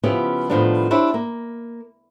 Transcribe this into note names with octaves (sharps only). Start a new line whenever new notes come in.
C#3 F3 B3 C#4 E4 G4
A2 D#3 F3 G3 B3 D4
C4 D4 E4 G4 C#5
A#3